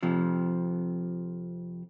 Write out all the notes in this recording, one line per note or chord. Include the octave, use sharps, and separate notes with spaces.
F2 C3 F3